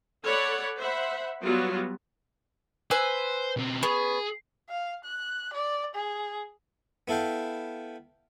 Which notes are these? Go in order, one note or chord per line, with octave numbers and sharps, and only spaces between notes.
A4 C#5 D5 F#5 B5
C5 E5 F#5 B5
F#3 G3 B3 F4 F#4
B4 C5 G#5 E6
B2 C4
B3 C#4 G#4
F5
F#6
D5
G#4
B3 E4 A4 F5 G5